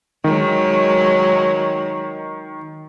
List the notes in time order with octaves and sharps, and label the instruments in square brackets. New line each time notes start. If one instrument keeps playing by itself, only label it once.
[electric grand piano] D#3 [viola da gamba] F#3 G#3